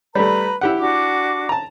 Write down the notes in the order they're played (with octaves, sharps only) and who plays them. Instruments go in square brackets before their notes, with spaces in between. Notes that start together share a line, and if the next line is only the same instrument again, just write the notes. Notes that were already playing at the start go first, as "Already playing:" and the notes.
[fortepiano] G3 A3 [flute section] B4 A#5 B5
[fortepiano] E4 G4 F#5
[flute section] D4 F#4 D6
[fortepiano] A5 A#5